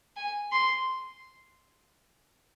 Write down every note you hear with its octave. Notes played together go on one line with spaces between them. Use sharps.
G#5
C6